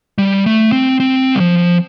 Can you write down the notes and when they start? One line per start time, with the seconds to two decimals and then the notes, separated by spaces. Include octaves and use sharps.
0.18 G3
0.46 A3
0.72 C4
1.00 C4
1.35 G3
1.40 F3